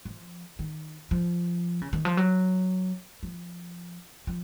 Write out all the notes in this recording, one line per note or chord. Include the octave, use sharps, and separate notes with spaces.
F3
D#3
F3
C#3
D#3
F3
F#3
F3
F3